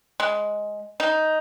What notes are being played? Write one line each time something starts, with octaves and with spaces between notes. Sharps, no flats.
G#3
D#4